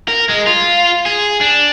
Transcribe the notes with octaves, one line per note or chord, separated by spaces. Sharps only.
A#4
G#3
F4
G#4
D4